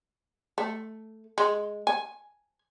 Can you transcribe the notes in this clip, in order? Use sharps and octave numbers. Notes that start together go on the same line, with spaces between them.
A3
G#3
G#5